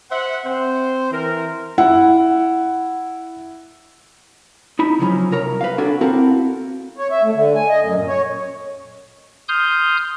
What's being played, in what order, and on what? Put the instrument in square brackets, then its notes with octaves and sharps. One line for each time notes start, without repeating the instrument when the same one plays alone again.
[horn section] C5 E5 F#5
C4 C5
E3 A#4
[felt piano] E4 F#5
[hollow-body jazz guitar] D#4 E4 B5
C#3 F3 F#3 C#4
C2 A#4 C#5 A#5
B4 F5
C#4 D4 F#4 A4
C4 E4 F#4 A4 A#4 F5
[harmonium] C#5
E5
A3
D3
G#5
D#5
F#2
A#2
C#5
[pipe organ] C6 D#6 F6 G6